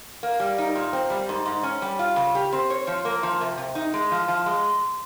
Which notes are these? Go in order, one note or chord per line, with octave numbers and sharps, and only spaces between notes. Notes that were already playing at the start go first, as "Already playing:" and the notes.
A#3
G3
D#4
A#2
C4
G3
G#2
G#2
C#4
G3
F4
C#3
G4
C4
C#5
F3
A#3
F3
C3
C3
D#4
G#3
F3
F3
G#3